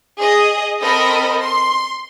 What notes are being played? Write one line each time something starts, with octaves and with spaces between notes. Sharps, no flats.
G#4 D#5
C4 A4 A#4 D#5 B5
C6